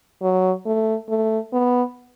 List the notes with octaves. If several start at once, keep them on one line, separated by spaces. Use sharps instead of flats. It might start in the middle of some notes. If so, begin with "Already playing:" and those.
F#3
A3
A3
B3